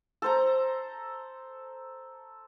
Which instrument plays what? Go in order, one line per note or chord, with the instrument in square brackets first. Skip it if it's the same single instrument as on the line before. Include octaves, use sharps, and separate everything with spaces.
[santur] A4 C5 A#5